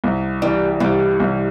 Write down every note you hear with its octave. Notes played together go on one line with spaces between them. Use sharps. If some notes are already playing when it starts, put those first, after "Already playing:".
C2
E3 G3
C2 G3
C2